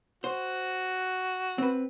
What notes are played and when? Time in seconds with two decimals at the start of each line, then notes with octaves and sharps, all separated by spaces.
0.24 F#4 C5
1.58 C4 B4